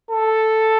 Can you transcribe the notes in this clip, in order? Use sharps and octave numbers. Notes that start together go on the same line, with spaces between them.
A4